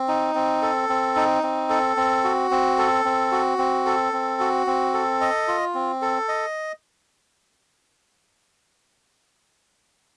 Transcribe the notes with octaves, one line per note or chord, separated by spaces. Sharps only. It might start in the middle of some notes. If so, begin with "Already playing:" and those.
Already playing: C4
D#4
C4
A4
C4
D#4
C4
A4
C4
F#4
C4
A4
C4
F#4
C4
A4
C4
F#4
C4
A4
D#5
F4
C4
A4
D#5